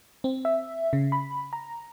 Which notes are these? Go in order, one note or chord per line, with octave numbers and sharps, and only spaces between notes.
C4
E5
C#3
B5
A#5